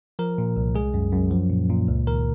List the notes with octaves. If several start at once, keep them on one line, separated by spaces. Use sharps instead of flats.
F3 A#4
A#2
C2
G#3 G#4
F#2
F#2
F3
A#2
A#2
C#2
D#3 A#4